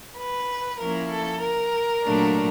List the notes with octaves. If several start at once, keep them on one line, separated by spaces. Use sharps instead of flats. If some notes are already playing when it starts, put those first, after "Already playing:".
B4
F3 A#3 C#4 E4 A#4
A4
A#4
A#2 F#3 A3 D4